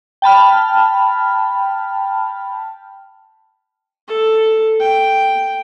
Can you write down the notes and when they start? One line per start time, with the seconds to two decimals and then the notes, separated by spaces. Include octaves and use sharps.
0.22 G5 A5 B5 F6
4.08 A4
4.81 G5